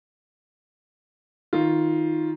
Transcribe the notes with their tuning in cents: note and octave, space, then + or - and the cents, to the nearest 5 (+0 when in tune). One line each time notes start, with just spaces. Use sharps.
D#3 +15 F4 +0